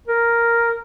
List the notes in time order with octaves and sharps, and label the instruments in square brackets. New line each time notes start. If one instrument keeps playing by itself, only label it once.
[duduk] A#4